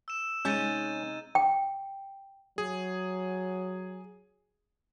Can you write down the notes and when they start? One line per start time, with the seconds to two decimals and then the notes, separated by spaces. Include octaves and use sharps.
0.08 E6 E7
0.45 C3 G#3 C#4 D#4 G6 A6 D#7
1.35 G5
2.58 F#3 G#4